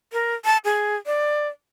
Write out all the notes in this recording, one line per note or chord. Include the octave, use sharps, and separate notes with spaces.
A#4
A5
G#4
D5